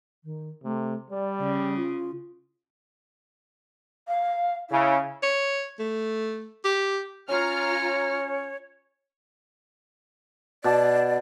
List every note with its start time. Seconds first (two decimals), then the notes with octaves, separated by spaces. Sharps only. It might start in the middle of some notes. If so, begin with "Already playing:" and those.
0.24 D#3
0.64 C3 A3
1.10 G3 D5
1.41 C#3
1.76 F4
4.08 F5
4.70 C#3 E4
5.23 C#5
5.79 A3
6.64 G4
7.29 C#4 F4 C#5 A#5 F6
10.64 B2 D5 A5 D6